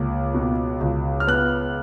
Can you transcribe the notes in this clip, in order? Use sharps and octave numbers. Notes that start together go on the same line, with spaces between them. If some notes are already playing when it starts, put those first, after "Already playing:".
Already playing: C#2 A#3
B2
C#2
F6
B3 F#6